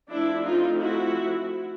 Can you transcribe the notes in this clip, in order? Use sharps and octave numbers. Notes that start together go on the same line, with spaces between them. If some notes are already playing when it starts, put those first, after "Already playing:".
F3 A3 C4 D4 E4
D#4 F4
E4 F#4